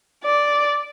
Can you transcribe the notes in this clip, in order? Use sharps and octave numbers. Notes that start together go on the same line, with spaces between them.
D5